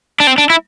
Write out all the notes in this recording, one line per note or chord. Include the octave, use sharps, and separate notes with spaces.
D4
C4
D4
E4